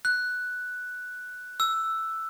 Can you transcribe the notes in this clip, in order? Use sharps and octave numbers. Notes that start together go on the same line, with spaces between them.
F#6
E6